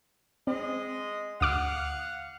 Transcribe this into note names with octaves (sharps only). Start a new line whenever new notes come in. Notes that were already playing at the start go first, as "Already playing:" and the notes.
G#3 C4 D#5
D2 F5 F#5 D6 F6